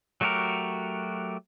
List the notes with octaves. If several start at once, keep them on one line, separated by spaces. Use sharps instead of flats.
F#3 A3 F#4 G4 A#4